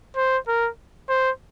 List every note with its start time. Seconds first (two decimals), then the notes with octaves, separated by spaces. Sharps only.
0.16 C5
0.48 A#4
1.09 C5